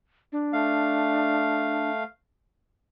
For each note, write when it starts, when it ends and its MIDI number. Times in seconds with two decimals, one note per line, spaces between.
0.32 1.90 62
0.53 2.04 57
0.53 2.04 77